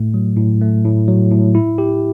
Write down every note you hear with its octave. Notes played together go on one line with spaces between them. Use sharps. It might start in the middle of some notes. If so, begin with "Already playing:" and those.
Already playing: A2 A3
F#3
A2
A3
A2
F#3
A2
E4
G4